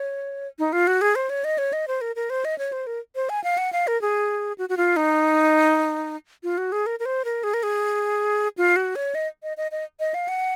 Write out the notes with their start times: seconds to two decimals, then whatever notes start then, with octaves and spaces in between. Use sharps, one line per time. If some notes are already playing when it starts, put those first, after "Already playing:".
Already playing: C#5
0.59 D#4
0.73 F4
0.87 F#4
1.01 G#4
1.15 C5
1.30 C#5
1.44 D#5
1.58 C#5
1.73 D#5
1.88 C5
2.01 A#4
2.16 A#4
2.30 C5
2.45 D#5
2.58 C#5
2.72 C5
2.87 A#4
3.15 C5
3.29 G#5
3.44 F5
3.58 F#5
3.73 F5
3.87 A#4
4.01 G#4
4.58 F#4
4.69 F#4
4.77 F4
4.96 D#4
6.43 F4
6.58 F#4
6.72 G#4
6.86 A#4
7.00 A#4
7.05 C5
7.25 A#4
7.44 G#4
7.54 A#4
7.63 G#4
8.57 F4
8.76 F#4
8.96 C#5
9.15 D#5
9.43 D#5
9.57 D#5
9.71 D#5
10.00 D#5
10.14 F5
10.28 F#5